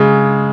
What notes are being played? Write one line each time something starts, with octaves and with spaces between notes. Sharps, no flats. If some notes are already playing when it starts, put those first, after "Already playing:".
Already playing: C#3 G#3